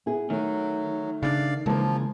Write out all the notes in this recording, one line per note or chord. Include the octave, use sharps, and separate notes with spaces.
B3 E4 G#4
D#3 F#3 A3
C#3 C4 D4 D5 F5
C#3 E3 F3 G#3 A#3 B4 A5